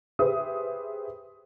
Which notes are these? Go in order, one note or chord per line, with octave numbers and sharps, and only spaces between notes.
G4 G#4 B4 C5 E5 D#6